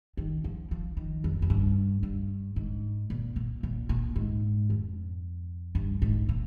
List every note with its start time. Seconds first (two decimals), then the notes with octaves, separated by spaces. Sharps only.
0.17 D#3
0.44 F3
0.71 F3
0.97 D#3
1.24 F2
1.42 F2
1.50 G2
2.03 G2
2.56 G#2
3.10 A#2
3.36 A#2
3.63 A#2
3.89 A#2
4.16 G#2
4.70 F2
5.75 G2
6.02 G#2
6.29 A#2